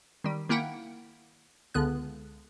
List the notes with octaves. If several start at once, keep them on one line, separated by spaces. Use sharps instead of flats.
D#3 G3
D#3 A#3 E4 F#5 G5
C#2 D3 B3 F#6